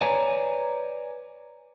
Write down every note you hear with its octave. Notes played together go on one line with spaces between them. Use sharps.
B4 C#5 D5 G#5 A#5